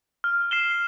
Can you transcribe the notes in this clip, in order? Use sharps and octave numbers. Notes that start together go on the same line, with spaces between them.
F6
C7 E7 G7